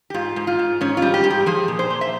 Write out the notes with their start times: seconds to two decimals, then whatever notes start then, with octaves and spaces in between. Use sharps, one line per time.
0.10 G4
0.14 G#2 F4
0.36 G#2
0.47 F4
0.59 G#2
0.81 G#2 C#4
0.97 F4
1.02 G3
1.14 G4
1.24 G#2
1.30 G4
1.46 F3 G#4
1.68 A#2
1.79 C5
1.90 A#2
2.01 E5